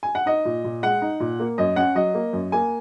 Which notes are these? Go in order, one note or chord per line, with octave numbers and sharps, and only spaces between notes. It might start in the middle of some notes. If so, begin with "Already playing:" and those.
G#5
F#5
D#4 D#5
A#2
A#2
G#3 F#5
D#4
A#2
A#3
F#2 D#5
C#4 F#5
F#3 D#5
A#3
F#2
A#3 G#5